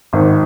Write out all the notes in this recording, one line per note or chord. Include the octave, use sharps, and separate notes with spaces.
G#1 G#2 D#3